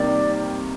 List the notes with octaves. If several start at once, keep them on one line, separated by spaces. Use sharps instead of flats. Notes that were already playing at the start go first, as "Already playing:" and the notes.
Already playing: C3 D#3 G3 A#3 D5